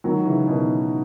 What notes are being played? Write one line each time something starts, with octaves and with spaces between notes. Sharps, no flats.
D#3 F#3
C#3 E3
B2 D#3